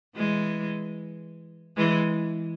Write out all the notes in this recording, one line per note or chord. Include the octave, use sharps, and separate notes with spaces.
E3 G#3
E3 G#3